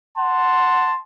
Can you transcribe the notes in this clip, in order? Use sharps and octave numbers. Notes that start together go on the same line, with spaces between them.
F#5 A5 C6